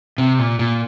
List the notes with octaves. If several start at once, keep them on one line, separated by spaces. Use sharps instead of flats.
C3
A#2
A#2